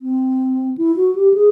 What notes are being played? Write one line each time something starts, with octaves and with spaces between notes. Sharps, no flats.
C4
E4
F#4
G4
G#4